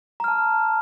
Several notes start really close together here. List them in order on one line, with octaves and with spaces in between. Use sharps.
A#5 F6 A5